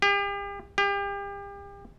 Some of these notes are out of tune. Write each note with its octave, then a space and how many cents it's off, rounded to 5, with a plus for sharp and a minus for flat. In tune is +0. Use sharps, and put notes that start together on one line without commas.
G4 +40
G4 +35